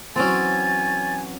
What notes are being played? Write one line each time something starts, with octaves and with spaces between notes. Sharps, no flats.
E3 F#3 C4 C#4 G#5 A6